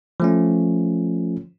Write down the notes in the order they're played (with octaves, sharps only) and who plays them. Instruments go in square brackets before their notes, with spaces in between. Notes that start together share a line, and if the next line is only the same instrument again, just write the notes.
[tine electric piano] F3 A3 C#4